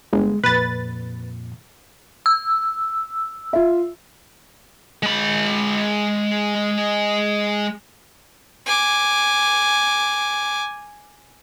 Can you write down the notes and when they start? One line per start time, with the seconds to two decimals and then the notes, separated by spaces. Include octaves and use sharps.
0.13 G1 G#3
0.43 F2 A#2 B4 A6
2.26 E6
3.53 F4 E5
5.03 G#3 B5
8.66 G#5 D6